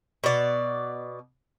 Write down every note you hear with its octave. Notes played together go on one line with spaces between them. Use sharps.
B2 D5